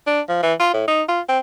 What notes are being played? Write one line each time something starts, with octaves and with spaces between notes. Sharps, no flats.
D4
F3
E3
F4
A2
D#4
F4
C4